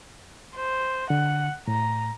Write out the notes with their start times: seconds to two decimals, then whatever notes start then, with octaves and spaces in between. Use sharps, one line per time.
0.56 C5
1.10 D3 F#5
1.68 A2 A#5